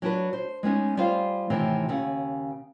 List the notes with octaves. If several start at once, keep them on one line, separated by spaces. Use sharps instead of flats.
F#3 D4 F#4 B4
C5
G#3 B3 C#4 D#4
G3 F4 G#4 C5 F5
A2 C3 D#3 E3 C4
D#2 C#3 F#5